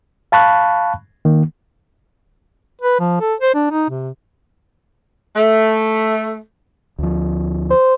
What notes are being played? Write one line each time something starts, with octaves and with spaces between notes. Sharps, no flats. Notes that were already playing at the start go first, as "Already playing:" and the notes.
F5 A5 B5 C#6 F#6
D#3 A#3
B4
F3
A4
C5
D4
D#4
C3
A3
D2 F3
C5